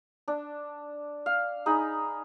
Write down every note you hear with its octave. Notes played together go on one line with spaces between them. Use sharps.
D4
F5
D#4 G#4 B5